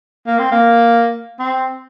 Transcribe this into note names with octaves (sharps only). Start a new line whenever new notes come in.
A#3
C4
A#3
C4